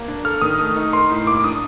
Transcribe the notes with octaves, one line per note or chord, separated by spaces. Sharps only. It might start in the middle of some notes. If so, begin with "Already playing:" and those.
Already playing: A#3
D4
A4 F6
D#3 D#6
A3
D#4
A#4 C6
A2
A#3 D6
D6
D4 D#6